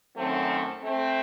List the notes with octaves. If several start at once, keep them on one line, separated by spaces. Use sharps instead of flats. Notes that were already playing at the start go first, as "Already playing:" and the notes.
F#2 D#3 F#3 A3 C4
A3 C4